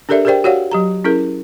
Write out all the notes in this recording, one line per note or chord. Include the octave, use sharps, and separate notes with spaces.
D4 G4 A4 A#4 D5 E5
G4 G#4 A#4 C5 D5 G5
F#4 G4 C#5 D5 F5 F#5
F#3 G4 A#5
C#4 E4 G#4 A#4